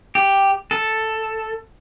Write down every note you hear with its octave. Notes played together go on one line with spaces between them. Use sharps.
G4
A4